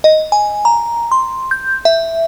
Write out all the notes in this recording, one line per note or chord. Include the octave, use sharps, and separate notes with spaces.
D#5
G#5
A#5
C6
G6
E5